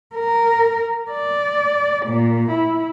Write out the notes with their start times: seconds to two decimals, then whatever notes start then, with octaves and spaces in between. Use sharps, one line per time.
0.15 A#4
1.11 D5
2.06 A#2
2.51 E4